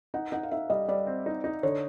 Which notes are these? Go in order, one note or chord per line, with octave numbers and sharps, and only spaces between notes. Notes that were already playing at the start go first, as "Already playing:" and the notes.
D#4 F#5
D#4 F#5
F5
D#4 E5
G3 D#5
G3 D5
C4
D#4
D#4
D3 C#5